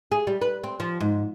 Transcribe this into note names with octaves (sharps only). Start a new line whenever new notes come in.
G#4
G3
B4
C4
F3
G#2